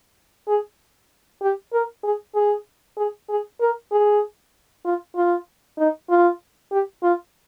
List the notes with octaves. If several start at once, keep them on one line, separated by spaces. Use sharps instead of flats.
G#4
G4
A#4
G#4
G#4
G#4
G#4
A#4
G#4
F4
F4
D#4
F4
G4
F4